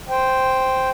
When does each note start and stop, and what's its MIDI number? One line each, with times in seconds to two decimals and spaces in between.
0.09 0.90 72
0.09 0.90 79